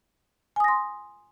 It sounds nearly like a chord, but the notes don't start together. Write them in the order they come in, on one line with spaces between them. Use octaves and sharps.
G#5 D#6 A#6 C6